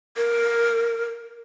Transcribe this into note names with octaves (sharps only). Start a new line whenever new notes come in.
A#4